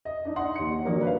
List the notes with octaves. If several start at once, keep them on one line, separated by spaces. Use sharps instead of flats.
D#5
D4 D#4
D#4 F#5 C6
D#2 C#7
G2 D#3 F#3 A#3
B4 F5